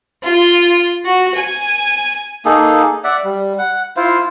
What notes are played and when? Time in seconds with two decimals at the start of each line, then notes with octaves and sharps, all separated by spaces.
0.23 F4
1.05 F#4
1.35 G#5
2.45 A#3 D#4 G#4 A4
3.04 D5 E5 F#5
3.24 G3
3.58 F#5
3.97 E4 F4 C5 F5